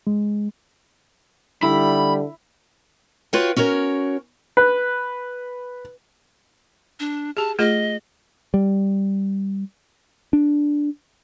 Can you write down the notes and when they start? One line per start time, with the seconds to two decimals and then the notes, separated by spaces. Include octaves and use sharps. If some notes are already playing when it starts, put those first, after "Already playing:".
0.07 G#3
1.63 D3 G3 E4 B5
3.33 F4 F#4 B4 C#5 F5 G5
3.56 C#4 F#4 A#4 C#5
4.57 B4
7.00 D4
7.37 G4 G#4 A5
7.59 A3 F4 G#4 D#5
8.54 G3
10.33 D4